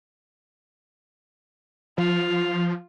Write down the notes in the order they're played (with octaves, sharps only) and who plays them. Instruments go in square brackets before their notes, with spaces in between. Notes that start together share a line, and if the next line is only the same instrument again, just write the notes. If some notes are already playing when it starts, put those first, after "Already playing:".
[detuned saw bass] F3 [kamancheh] F4